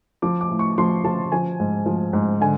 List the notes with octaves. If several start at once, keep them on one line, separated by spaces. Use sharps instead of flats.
F3 D6
D6
A2
C#6
F3 C6
F3 A5
F3 G#5
G#2
F3
G#2
D3 G#5